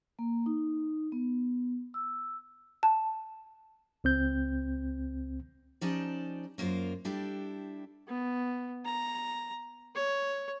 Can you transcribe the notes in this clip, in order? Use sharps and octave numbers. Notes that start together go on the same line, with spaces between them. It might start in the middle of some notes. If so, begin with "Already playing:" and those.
A#3
D#4
B3
E6
A5
C#2 C4 G6
F3 C#4 D#4 G4 D5 A5
F#2 A#3 C4 F4 C5
G3 D4 E4 G4 A4
B3
A#5
C#5